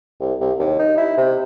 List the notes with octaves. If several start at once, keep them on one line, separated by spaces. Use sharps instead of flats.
C2
C2
D#2
D#4
E4
C3